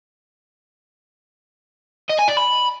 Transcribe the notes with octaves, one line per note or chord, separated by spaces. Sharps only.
D#5
G#5
D5
B5